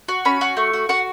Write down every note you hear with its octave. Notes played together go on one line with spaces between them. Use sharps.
F#4
C#4 B5
F#4
A3
F#4
F#4 F#5